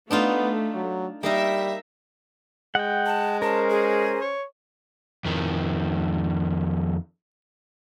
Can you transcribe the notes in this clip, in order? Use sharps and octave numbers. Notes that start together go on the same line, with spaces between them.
A3 B3 D4 D#4 F4
F#3
G3 A#3 D#4 A#4 E5
G#3 F#5 G5
A5
C#4 A#4 C5 A5
G#4
C#5
F2 D#3